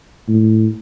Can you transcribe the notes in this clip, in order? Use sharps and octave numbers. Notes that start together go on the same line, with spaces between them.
A2